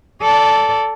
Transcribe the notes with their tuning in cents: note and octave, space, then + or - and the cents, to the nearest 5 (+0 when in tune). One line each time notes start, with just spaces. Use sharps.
A4 +0 D5 -20